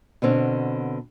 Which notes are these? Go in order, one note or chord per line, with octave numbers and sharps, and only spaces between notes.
B2 D3 C4 C#4